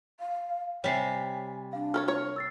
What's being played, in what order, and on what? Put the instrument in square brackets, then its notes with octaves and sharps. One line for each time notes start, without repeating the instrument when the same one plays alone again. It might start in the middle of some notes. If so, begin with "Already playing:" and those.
[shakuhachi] F5
[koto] C3 G3 [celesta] C#5 B6 C7 [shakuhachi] G#5
[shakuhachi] D4 [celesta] F5
[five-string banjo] A4 A#4 C#5 [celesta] F6
[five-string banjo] A#4 C#5
[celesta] E6 A6 C7